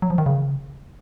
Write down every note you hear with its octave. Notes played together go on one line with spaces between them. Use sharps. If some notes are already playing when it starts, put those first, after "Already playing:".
F#3
F3
D#3
C#3